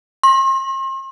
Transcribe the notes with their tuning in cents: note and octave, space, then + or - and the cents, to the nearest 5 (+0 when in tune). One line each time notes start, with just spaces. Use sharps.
C6 +45